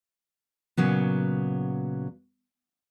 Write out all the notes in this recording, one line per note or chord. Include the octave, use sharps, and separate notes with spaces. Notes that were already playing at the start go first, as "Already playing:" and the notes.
A#2 C#3 F#3 B3